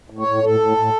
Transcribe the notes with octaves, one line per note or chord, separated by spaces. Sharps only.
A2
C#5
A2
A2 A4
A2
A2